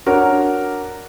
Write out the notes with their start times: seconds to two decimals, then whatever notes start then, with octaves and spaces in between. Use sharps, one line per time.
0.06 D4 F#4 A#4 C#5